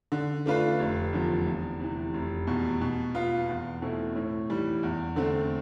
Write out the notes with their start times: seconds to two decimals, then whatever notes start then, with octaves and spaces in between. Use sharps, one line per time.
0.12 D3
0.46 A3 D4 F4 B4
0.80 F1
1.13 E2 D3 F3
1.47 E2
1.80 C3 E3
2.14 F1
2.47 E2 B2
2.81 B2
3.15 B3 F4
3.49 E2
3.82 B2 A3 C4 E4
4.16 A2
4.50 E3 G3
4.83 E2
5.16 D3 A3 C4